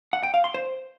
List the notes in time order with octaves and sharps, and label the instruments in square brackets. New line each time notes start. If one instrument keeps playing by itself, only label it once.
[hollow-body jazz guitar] F#5
G5
F5
C6
C5